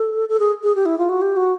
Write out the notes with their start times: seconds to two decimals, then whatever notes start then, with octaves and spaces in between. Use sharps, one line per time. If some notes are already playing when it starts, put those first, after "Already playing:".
Already playing: A4
0.29 A4
0.39 G#4
0.63 G#4
0.75 G4
0.86 E4
0.98 F4
1.09 F#4
1.22 G4
1.37 F#4